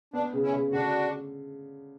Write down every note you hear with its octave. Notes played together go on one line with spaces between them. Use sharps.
B3 D4
C#3
C#4 E4
C#3
D3 D4 F#4